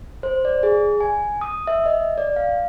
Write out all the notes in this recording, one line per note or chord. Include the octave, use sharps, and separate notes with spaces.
C5
D5
G#4
G#5
D#6
E5
D#5
D5
F5